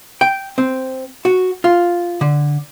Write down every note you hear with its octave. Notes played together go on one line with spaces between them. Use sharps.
G5
C4
F#4
F4
D3